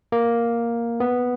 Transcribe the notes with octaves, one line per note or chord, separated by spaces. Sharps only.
A#3
B3